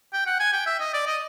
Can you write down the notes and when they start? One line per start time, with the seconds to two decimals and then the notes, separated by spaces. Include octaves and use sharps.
0.13 G5
0.26 F#5
0.40 G#5
0.53 G5
0.66 E5
0.79 D#5
0.93 D5
1.07 D#5